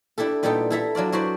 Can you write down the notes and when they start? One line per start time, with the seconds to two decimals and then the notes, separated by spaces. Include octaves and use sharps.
0.18 D4 E4 G4 A4
0.43 A#2 G3 B3 D#4 A4 G5
0.70 E4 A4 E5 A#5
0.95 F#3 D4 F4 D5
1.12 F#3 E4 F#4 B4 C5 D5